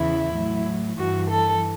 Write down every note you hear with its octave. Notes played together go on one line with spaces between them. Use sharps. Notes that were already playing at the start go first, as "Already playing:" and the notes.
Already playing: E2 C#3 E3 E4
A2 F#3
G2 E3 F#4
A4